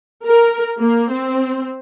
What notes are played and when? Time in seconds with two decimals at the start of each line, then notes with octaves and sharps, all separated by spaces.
0.25 A#4
0.80 A#3
1.11 C4